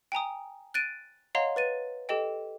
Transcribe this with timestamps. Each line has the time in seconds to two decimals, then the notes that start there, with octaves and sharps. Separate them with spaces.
0.12 G5 G#5 A#5 D#6
0.74 F#6 A6 D7 D#7
1.35 C#5 D#5 F5 F#5 A#5 C6
1.56 B4 A6 D#7
2.09 G4 A4 D#5 G5